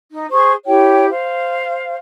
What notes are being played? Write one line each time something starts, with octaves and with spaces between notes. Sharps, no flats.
D#4
G#4 C5 C#6
E4 G4 C#5 G5
C5 F5